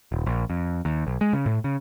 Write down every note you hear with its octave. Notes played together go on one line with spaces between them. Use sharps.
D#1
A#1
F2
D#2
B1
G#3
C#3
A2
C#3